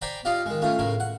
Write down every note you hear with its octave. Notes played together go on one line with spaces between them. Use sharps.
C5 D5 G5 G#5 A#5 B5
F4 G4 D5 D#5 F5
D#3 G#3
A3 C#4 F4
A2 C#3 A#4 G#5
F#5